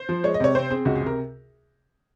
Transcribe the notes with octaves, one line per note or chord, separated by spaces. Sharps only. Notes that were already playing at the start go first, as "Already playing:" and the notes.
Already playing: C5
F3
G#3 C#5
D#5
C3 C#5
C4 C5
C4 G#4
C#2 F#4
G#4
C3
A#4